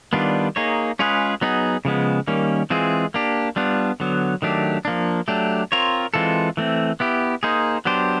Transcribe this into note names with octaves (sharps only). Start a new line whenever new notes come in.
D#3 G3 B3 D4 F4
A#3 D#4 G#4 C#5
G#3 C#4 F4 G#4 B4
F#3 B3 D#4 G#4
C#3 F3 G#3 B3
D#3 G3 A#3 C#4
E3 G#3 C4 F4 G#4
A#3 D4 G4
G3 B3 D4 F4
D3 F#3 B3
D#3 F#3 A3 D4 G4
F3 A#3 D4
F#3 A3 D4 G4
C4 F4 A#4 C#5
E3 G#3 C4 F4 A4
E3 A3 C4
B3 E4 G4
A#3 D#4 G#4 C5
F#3 B3 D4 G4 C5